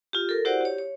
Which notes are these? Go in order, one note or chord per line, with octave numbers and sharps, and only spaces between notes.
F4 G4
A4 A#4
E4 F#4 G4 C5 D5 F#5
G4 C#5
C#5